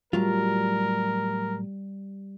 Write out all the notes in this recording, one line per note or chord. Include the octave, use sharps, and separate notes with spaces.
A2 F#3 G3 F4 A#4